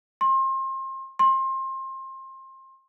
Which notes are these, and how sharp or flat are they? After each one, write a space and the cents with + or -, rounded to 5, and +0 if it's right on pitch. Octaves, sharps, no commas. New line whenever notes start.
C6 +30
C6 +25